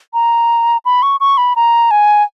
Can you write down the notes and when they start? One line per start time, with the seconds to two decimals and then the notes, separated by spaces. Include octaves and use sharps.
0.14 A#5
0.85 B5
1.03 C#6
1.20 C#6
1.37 B5
1.56 A#5
1.91 G#5